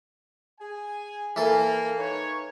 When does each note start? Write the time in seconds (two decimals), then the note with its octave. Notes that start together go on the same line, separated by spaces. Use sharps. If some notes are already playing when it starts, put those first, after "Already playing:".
0.60 G#4 G#5
1.36 E3 A#3 A4
1.98 D#4 B4 C#5